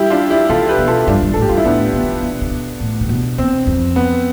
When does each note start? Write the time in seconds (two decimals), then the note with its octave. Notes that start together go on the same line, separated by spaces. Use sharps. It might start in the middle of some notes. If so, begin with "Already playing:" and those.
Already playing: G3 E4 G4
0.10 D4 F4
0.30 E4 G4
0.49 C3 F4 A4
0.68 G4 B4
0.79 B2
0.87 F4 A4
1.07 G2 D4 F4
1.22 G2
1.34 A4
1.36 A2
1.42 G4
1.49 G2 F4
1.57 E4
1.65 A2 B3 D4
1.93 B2
2.03 C3
2.13 B2
2.22 C3
2.32 B2
2.41 C3
2.51 B2
2.81 A2
3.01 C3
3.09 B2
3.38 E2 C4
3.67 F2
3.96 B3